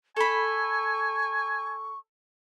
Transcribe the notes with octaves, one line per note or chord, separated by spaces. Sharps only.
A4 G#5 B5 C#6